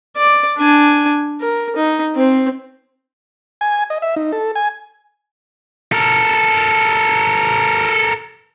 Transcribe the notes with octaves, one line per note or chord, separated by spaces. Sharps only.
D5
D4 G#5
A#4
D#4
C4 C5
G#5
D#5
E5
D#4
A4
G#5
A4 A#4